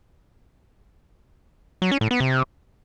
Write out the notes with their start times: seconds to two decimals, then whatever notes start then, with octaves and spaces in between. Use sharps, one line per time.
1.82 F#3
1.91 C#4
2.01 A2
2.11 B3
2.20 C3